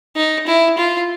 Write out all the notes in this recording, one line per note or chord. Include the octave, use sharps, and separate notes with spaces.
D#4
E4
F4